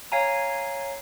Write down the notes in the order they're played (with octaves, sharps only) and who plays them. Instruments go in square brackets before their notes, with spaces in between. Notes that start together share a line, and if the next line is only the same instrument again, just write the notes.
[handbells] C#5 F5 G#5 A#5